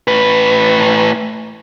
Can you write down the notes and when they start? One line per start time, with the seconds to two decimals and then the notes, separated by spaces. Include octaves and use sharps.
0.08 A2 B4